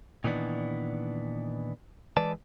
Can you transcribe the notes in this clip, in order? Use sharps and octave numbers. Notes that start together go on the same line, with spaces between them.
A#2 D#3 E3 B3 D4
E3 G#3 B4 D5 A5